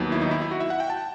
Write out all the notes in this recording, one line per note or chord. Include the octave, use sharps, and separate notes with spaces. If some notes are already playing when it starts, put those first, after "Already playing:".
Already playing: D#2 D#3 F#3 B3
E4
D#4
E4
E4
F#4
E5
F#5
G5
A5